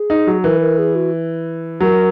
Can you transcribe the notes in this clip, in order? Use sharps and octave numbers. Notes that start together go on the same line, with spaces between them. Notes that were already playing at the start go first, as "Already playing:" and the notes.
Already playing: G#4
D#4
F#3
E3 A#4
A#4
G#4
F#4
F#3 A#4